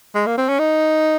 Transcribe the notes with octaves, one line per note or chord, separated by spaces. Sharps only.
G#3
A#3
C4
C#4
D#4